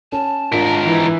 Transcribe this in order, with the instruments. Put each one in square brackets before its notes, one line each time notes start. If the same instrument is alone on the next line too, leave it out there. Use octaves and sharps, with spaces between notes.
[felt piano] C#4 [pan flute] A5
[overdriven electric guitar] G#2 A#4 [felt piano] D4 F4 B6
[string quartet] E3